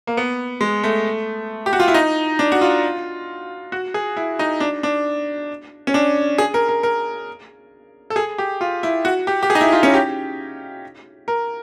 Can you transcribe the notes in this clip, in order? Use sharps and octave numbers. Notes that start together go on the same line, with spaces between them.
A#3
B3
G#3
A3
G4
F#4
F4
E4
D#4
D4
F#4
F4
F#4
G#4
E4
D#4
D4
D4
C#4
D4
G#4
A#4
A#4
A#4
A4
G#4
G4
F4
E4
F#4
G4
G4
G#4
D#4
E4
F4
C#4
G4
A#4